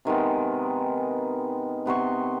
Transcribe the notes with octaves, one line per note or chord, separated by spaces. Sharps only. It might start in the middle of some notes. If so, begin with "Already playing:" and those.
C3 D#3 G#3 B3
C3 B3 C6 C#6